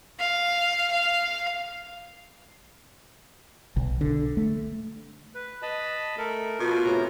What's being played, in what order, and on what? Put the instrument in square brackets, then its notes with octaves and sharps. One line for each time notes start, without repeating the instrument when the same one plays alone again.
[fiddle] F5
F5
[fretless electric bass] B1
D3
A3
[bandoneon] B4
D#5 A5 B5
[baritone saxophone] A3 [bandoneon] A#4
[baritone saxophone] B2 [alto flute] F4
[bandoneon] A2 C3 A#5